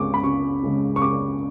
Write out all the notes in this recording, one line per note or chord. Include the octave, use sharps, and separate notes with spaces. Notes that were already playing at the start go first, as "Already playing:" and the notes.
Already playing: C#2 C#3 G#3 C#6 D6
B5
C#2 C#6
C#3 G#3
C#6
C#2 D6